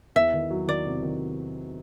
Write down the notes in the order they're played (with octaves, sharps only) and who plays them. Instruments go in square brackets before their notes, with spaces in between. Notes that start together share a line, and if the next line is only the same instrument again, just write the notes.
[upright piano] E2 [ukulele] E5
[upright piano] D#3
F#3
[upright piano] D#3 [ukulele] D5
[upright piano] C3
D#3